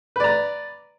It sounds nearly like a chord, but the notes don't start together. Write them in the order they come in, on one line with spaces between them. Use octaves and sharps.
B4 D5 A#5